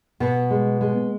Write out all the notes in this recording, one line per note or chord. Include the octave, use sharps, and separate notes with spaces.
B2 B3
G#3
G#3